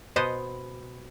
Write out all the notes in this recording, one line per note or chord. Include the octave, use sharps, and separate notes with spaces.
B2 B3 C5 D#5